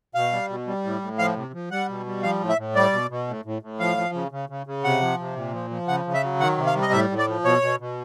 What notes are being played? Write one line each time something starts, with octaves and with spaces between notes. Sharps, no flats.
B2 F5
G3
B2
G3
A2
A2
F3 F5
C3
F3
G3 F#5
B2
G3
F3 F5
A2
E5
A2
G3 D5
B2
B2
A2
A2
A2
F3 F5
F3
C#3
C#3
C#3
C#3
C3 F#5
F3
C3
A#2
F3
F3
C#3 F#5
C#3
E5
F#3
D#3 F#5
C3
F5
G3
D#5
A2 E5
A2
D5
F3
B2 C#5
B2
B2